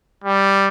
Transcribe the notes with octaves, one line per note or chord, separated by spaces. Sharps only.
G3